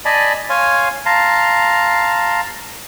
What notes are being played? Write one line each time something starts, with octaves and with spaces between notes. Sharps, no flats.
D5 D#5 G#5 A5 B5
C#5 F5 G#5 C6
F5 A5 A#5 C6